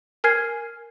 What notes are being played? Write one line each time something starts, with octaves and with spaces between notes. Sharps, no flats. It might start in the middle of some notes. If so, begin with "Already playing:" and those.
A#4 G#5 F6 G#6 C7